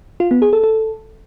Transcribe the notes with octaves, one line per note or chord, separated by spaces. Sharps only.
F4
B3
G#4
A4
A4